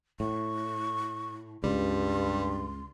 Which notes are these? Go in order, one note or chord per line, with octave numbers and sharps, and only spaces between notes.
A2 C#6
C#2 G2 G3 C6